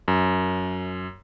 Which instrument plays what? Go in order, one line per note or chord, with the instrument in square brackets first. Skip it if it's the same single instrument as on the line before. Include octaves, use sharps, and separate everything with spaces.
[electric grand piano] F#2